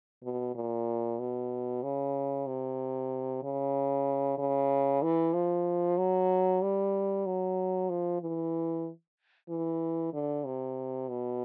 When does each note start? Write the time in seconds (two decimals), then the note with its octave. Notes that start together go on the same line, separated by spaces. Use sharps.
0.23 B2
0.55 A#2
1.19 B2
1.83 C#3
2.47 C3
3.43 C#3
4.38 C#3
5.02 E3
5.33 F3
5.98 F#3
6.62 G3
7.26 F#3
7.90 F3
8.21 E3
9.49 E3
10.13 D3
10.45 C3
11.09 B2